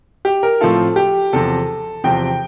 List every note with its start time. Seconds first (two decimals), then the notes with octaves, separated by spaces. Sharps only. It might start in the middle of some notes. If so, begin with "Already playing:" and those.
0.25 G4
0.43 A#4
0.61 A2 F3 C4 F4 A4
0.96 G4
1.33 E2 C3 F3 A4
2.04 E2 C3 F3 G5